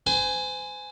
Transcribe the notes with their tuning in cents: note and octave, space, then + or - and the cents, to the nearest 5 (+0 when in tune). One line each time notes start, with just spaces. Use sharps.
C5 -40 G#5 +0